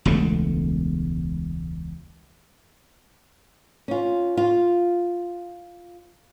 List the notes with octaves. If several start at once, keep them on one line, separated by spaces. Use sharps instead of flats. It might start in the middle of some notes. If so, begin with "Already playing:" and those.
E1 C#2 B2 A3
C#4 F4
F4